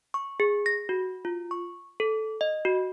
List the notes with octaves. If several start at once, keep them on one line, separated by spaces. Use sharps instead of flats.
C#6
G#4
A#6
F#4
F4
C#6
A4
D#5
F#4